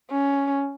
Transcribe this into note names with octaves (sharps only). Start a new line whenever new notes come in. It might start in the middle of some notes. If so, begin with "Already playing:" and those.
C#4